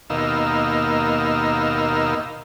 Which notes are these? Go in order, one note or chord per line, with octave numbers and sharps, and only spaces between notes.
D#2 B2 A#3 D#4 F5 E6